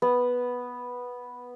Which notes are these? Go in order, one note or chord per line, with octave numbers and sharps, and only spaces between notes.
B3